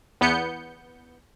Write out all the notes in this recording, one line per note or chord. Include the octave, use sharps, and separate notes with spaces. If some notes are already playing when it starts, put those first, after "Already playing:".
E2 B3 G6 C#7